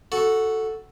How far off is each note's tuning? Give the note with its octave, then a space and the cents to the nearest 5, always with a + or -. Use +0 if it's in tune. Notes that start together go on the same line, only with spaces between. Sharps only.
F#4 +0 A4 +0